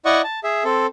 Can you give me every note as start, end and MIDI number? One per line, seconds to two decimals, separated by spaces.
0.05 0.22 64
0.05 0.22 74
0.05 0.22 75
0.05 0.22 78
0.05 0.22 85
0.24 0.40 81
0.44 0.64 68
0.44 0.64 76
0.64 0.87 60
0.64 0.87 69